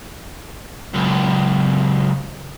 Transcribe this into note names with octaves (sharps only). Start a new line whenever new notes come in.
C#2 F#2